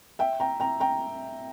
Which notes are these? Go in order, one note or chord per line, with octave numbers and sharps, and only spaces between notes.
E5 G5
G5 A#5
G5 A#5
G5 A#5